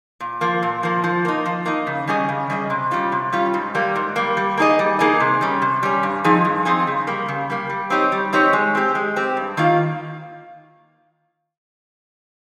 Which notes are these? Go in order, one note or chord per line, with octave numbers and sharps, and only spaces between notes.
A#2
F3 A#3
A#2
F3 A#3
F3
A#3 D#4
F3
A#3 D#4
C#3
G3 C#4 G#4 D#5
C#3
G3 C#4 G#4 D#5
C3
G3 C#4 F4
C3
G3 C#4 F4
G#2
G3 A#3
G#2
G3 A#3
G3
A#3 D#4 G#4 D#5
G3
A#3 D#4 G#4 D#5
C3
G3 C#4
C3
G3 C#4
G2
F3 C4 D#4 G#4
G2
F3 C4 D#4 G#4
C#3
G3 A#3
C#3
G3 A#3
G3
C4 D#4 G4 C#5
G3
C4 D#4 G4 C#5
G#3
C4 G4
G#3
C4 G4
G2
D#3 A#3 F4